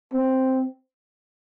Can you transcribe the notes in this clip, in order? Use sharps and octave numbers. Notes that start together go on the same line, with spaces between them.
C4